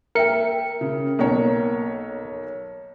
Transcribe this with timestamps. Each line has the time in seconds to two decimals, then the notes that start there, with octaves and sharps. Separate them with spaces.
0.15 A#4 E5 G5 C#7
0.81 C#3
1.19 B1 A#3 C#5